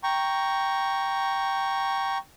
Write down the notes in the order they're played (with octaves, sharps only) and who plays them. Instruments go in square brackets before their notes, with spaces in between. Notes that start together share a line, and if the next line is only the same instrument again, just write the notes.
[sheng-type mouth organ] G5 A#5 C#6